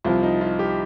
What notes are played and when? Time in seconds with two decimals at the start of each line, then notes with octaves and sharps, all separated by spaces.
0.05 C2 C3 F3 F4
0.23 D#4
0.41 F4
0.59 G4